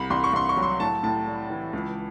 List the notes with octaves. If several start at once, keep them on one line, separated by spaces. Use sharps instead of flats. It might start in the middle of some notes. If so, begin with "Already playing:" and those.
Already playing: C2 B5
C2 C6
C#6
C2 C6
C#6
F#3
C6
A2 A5
A2 A5
G3
E3
C#2